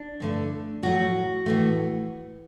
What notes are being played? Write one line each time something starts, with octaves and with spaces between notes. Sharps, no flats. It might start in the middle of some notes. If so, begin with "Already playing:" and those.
Already playing: D4
G2 D3 A3
A2 F#3 A3 F#4
A2 E3 A3